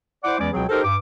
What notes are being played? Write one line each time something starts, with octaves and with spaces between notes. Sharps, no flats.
E4 C5 D5 F#5 D6
E2 E3 G#3 C#4 D5 D6
C#2 B2 F#3 C4 G#4 G5
D#4 G4 A4 A#4 C5
G2 D6